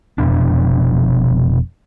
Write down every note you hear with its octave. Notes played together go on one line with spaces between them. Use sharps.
F1 F2 B2 D4